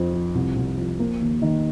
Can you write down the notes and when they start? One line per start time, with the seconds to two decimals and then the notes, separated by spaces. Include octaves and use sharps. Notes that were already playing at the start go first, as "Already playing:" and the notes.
Already playing: F2 F3 C4
0.13 F3
0.35 C2
0.56 C2
0.78 F3
0.99 A#3
1.21 D#2
1.42 D#3